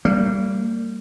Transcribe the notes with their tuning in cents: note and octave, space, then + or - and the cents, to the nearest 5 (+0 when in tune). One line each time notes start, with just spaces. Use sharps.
G3 +0 A#3 -35